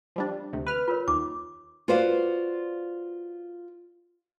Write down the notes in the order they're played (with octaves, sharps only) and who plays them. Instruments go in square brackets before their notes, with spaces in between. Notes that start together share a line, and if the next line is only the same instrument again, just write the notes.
[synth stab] F3 G3 D4
D2 C3
B4 F6
[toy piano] F4 A#4 C#5
[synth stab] D#2 [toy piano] D6
[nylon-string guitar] F4 F#4 B4 C5 D5 F5